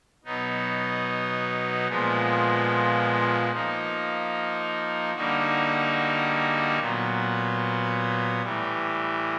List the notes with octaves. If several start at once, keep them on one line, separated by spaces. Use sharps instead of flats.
B2 F#3 B3 D#4
A#2 F3 G#3 B3
F3 A#3 D#4
D3 G3 A#3 D#4 F#4
A#2 F#3 B3
A2 E3 G3